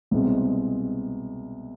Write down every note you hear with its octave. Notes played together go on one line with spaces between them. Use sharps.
C2 B2 G#3 C4